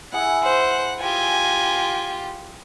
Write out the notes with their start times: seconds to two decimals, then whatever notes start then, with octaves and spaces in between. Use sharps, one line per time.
0.13 E4 G#4 F#5
0.44 C5 F#5
1.01 F4 G4 G#5